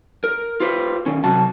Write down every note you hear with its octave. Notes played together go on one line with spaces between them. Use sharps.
A#4
F4 G4 B4 C5
D#3 C#4
C3 F#3 F#4 A5